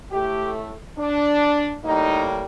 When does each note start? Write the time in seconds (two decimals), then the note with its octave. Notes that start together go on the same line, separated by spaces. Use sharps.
0.11 A2 A3 G4
0.97 D4
1.83 A2 G3 A#3 D#4